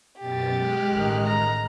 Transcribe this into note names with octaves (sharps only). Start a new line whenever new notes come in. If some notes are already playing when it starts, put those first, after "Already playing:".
F#2 B2 G4 A6
G#3 F6 F#6
A1 D#3
A#5